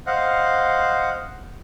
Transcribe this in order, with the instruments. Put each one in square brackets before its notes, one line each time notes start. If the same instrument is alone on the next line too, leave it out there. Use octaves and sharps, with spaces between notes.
[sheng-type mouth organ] C5 D#5 F5 F#5